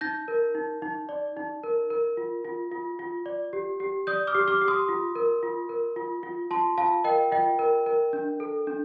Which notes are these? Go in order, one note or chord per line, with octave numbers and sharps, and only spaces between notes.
D#4 G6 A#6
A#4
D#4
D#4
D5
D#4
A#4
A#4
F4
F4
F4
F4
D5
G4
G4
D5 D#6 G6
D6 F6
G4
D6 F6
G4
C6 D#6
F4
A#4
F4
A#4
F4
F4
F4 A5 C6
F4 F5 A5
A#4 D#5 G5
F4 D#5 G5
A#4
A#4
D4
A4
D4